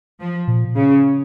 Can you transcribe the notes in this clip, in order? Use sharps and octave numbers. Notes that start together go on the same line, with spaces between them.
F3
A#2
C#3